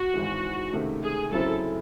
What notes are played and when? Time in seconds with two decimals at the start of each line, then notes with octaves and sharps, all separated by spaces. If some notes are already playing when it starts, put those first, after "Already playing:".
Already playing: F#4
0.14 G#1 G#2 E3 G#3
0.73 C#2 C3 D#3 A3
1.03 G#4
1.32 F#2 C#3 F#3 C4 E4 A4